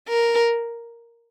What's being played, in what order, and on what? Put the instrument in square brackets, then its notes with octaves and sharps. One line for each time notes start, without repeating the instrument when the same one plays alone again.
[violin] A#4